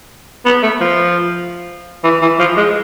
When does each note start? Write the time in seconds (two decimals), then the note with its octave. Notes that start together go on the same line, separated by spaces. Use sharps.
0.45 B3
0.63 A3
0.80 F3
2.04 E3
2.22 E3
2.39 F3
2.57 G#3